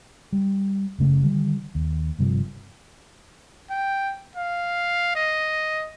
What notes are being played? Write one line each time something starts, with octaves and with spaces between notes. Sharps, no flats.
G3
F#1 C#3 A3
D3 D#3 G3
D#2
G1 G2 C3 F3
G5
F5
D#5